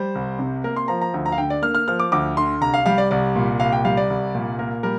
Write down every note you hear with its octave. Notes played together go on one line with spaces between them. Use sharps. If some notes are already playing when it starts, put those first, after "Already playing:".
Already playing: G3 C5
C2
C3
A#3 A#4
C6
F3 A#5
A#5
D2
A#5
F5
D3 G5
D5
A#3 F6
F6
F3 F6
D6
D2 D6
D3 C6
C2 A#5
F5
G3 F5
D5
C2 D5
A#2
C2 F5
G5
G3 F5
D5
C2
A#2
A#3 A#4
G3 A#4